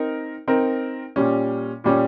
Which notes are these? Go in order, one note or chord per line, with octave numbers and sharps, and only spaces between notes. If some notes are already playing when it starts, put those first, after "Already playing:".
Already playing: C4 D#4 A#4
C4 D#4 A#4
A#2 G3 C#4
A#2 G3 C#4